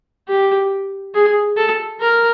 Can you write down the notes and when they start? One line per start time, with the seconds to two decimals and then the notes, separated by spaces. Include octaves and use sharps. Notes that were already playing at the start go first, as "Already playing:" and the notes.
0.28 G4
1.15 G#4
1.57 A4
2.00 A#4